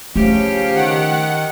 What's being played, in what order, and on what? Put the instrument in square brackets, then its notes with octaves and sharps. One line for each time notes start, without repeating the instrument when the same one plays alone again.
[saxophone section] C#3 F3 C#4 [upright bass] A3 [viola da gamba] G4
[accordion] D#3 F#5